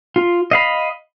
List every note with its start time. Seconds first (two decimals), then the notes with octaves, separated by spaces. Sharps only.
0.16 F4
0.51 D#5 F5 B5